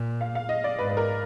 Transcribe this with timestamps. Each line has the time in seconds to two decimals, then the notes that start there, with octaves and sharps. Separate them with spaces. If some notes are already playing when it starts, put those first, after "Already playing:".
Already playing: A#2
0.21 F5
0.35 F5
0.49 D#5
0.64 D5
0.78 G#2 B4
0.89 B4
0.97 A#4